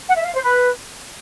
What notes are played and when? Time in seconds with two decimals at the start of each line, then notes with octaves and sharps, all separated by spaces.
0.08 F#5
0.16 E5
0.25 F5
0.34 C5
0.43 B4